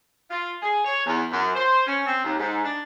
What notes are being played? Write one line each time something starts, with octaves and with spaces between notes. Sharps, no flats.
F4
G#4
C#5
E2
F#2
C5
C#4
C4
D#2
G#2
D4